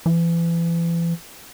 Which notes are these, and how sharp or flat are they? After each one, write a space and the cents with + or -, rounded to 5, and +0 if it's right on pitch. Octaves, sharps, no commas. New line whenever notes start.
E3 +35